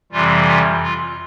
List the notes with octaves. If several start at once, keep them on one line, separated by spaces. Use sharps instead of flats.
F2 C3 E3 G3 F4
F4
F4